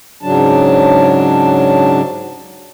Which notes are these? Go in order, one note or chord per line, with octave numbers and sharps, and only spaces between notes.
G#2 C#3 F#3 D4 A5